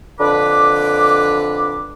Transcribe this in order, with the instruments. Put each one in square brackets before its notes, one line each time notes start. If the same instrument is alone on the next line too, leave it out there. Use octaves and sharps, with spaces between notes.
[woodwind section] F2 D3 B4 D6